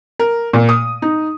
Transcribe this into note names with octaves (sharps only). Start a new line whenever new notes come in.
A#4
A#2
D#6
D#4